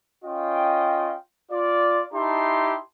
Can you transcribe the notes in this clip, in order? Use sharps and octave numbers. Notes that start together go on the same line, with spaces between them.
C#4 F4 D#5 G5
F4 D5
D#4 E4 G4 A5 C6